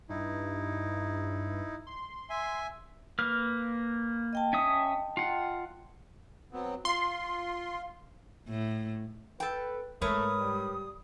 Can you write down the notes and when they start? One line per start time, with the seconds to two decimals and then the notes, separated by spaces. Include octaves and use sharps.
0.09 G2 D#4 E4
1.87 C6
2.30 E5 G#5
3.19 A#3 B4 F6
4.33 D#5 G5 A5
4.53 C#4 E5 D#6
5.17 F4 F#5
6.52 F#3 B3 C4
6.85 F4 C6
8.48 A2
9.40 A4 B4 G5
10.02 G#2 A3 A#4 B4 C#5 D#6
10.39 G3